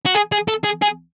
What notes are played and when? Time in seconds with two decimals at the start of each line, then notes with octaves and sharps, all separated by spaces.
0.05 F#4
0.14 G#4
0.32 G#4
0.48 A4
0.64 G#4
0.82 G#4